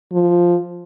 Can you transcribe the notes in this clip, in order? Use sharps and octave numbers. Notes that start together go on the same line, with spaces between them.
F3